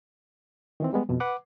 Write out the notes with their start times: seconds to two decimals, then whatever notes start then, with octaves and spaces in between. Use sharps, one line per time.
0.80 D#3 E3 C4
0.93 G3 G#3 B3
1.09 F2 B2
1.20 B4 F#5 D6